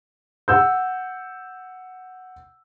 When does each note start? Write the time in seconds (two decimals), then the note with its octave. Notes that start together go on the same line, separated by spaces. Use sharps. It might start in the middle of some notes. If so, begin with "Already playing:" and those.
0.48 F#5 E6 G6